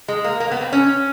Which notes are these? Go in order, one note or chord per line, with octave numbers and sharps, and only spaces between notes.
G#3
A#3
A#3
B3
C4
C#4